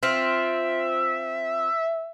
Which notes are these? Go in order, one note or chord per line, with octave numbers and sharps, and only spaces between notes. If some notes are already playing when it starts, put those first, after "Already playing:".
C4 F4 E5